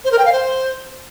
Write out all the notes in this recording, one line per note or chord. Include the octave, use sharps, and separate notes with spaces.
C5
A#4
G5
F5
C5